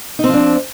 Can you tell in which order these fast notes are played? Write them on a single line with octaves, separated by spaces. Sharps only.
D#4 C4 F3 D4